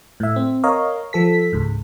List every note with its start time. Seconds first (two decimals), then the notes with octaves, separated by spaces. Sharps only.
0.20 A2 E5
0.36 C4
0.63 A#4 C#5 D#5 F5
1.13 F3 A4 B6
1.53 C#2 G#2